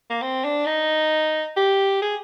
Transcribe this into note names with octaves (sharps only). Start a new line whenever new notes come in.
A#3
C4
D4
D#4
G4
G#4